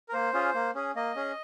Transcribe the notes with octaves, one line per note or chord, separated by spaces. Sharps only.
A#4
A#3 C5
C#4 F4 G#4
A#3
C#4 G#4
A#3 D#5
C#4 G#4